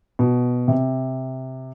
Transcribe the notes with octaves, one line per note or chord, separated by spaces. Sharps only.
B2
C3